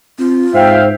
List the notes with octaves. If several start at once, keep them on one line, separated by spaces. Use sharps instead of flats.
C4 F4
G#2 C5 E5 F5 G5